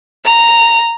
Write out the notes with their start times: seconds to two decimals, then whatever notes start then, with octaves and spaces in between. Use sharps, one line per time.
0.25 A#5